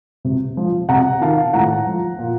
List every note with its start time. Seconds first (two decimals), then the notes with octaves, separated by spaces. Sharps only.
0.25 C3
0.57 F3
0.89 C3 F#5 A#5
1.21 D#3 F5 A5
1.53 A2 F#5 A#5
1.87 F3
2.19 A#2